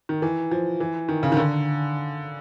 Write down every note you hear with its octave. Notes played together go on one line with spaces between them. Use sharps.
D#3
E3
F3
E3
D#3
C#3
D#3
D3